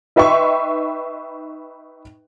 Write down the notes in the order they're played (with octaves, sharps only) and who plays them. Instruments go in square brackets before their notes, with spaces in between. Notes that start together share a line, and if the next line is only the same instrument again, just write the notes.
[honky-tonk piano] D#4 B4 E5 G5 C6 C#6